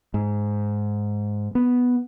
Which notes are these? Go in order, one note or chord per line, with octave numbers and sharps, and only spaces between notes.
G#2
B3